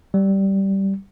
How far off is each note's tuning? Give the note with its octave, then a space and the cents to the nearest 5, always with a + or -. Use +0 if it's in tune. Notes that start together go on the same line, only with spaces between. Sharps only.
G3 -10